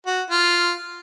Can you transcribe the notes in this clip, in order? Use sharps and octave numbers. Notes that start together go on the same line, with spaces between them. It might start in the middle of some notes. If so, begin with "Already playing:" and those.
F#4
F4